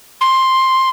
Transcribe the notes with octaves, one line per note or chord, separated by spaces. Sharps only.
C6